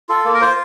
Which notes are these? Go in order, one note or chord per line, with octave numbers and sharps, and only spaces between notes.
F4 A4
A#3
A#4
F4 C5